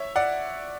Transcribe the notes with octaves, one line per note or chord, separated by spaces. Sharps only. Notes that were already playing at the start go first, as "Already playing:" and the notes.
Already playing: C#5 E5
D5 F#5